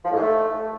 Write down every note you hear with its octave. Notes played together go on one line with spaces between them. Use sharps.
F3
A2
G#2
A3